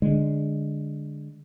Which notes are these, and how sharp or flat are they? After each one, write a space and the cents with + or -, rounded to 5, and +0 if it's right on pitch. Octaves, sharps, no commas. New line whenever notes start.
D3 +5 G#3 -5